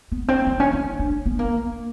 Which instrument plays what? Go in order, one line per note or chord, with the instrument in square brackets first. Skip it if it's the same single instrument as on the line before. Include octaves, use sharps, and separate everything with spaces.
[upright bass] B3
C4
C4
C#4
C#4
D4
B3
A#3